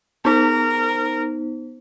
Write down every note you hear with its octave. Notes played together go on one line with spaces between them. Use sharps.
B3 D#4 A#4 C5